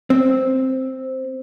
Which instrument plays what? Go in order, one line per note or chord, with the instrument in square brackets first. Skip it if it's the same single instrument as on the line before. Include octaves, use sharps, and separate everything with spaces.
[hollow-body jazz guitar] C4